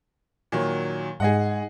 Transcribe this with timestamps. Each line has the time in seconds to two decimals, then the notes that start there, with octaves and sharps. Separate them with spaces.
0.52 A#2 D#3 F#3
1.20 G#2 G#4 D#5 F#5